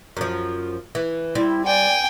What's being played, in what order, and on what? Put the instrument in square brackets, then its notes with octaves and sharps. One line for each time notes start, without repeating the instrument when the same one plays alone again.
[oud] F#2 F3
E3
[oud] G3 C4 [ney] E4
[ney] D5 [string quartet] G5 G#5